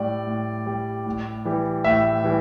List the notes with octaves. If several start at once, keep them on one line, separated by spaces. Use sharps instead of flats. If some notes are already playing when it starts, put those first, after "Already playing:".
Already playing: A2 G3 D5
A2
G3
A2
E3 G3
A2 E5
E3 G3